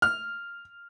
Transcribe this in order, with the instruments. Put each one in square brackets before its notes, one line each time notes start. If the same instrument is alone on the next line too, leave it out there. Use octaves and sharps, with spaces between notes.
[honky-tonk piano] F6